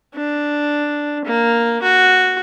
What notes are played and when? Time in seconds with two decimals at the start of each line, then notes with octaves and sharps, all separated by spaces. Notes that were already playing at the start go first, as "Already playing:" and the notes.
0.15 D4
1.25 A#3
1.82 F#4